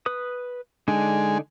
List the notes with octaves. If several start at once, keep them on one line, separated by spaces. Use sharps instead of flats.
B4 D#6
D3 G#3 D4 D#4